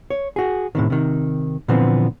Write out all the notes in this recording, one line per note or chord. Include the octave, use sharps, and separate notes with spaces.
C#5
F#4 G#4
A2 C3 D#3
C3 D#3
A#2 D3 E3 F3 B3 C4